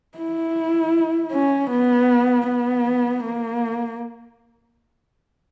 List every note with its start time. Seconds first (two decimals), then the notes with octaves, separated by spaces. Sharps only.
0.18 E4
1.32 C#4
1.71 B3
2.48 B3
3.24 A#3